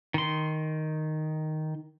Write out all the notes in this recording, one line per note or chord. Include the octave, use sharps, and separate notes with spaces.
D#3 C6